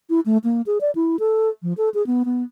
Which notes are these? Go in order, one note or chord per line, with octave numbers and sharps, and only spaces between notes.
E4
A3
A#3
G#4
D5
E4
A4
F3
A4
G#4
B3
B3